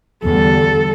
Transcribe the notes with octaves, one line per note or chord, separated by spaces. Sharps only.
E2 D3 G3 A4